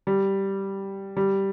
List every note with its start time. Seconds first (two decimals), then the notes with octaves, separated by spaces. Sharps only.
0.07 G3
1.17 G3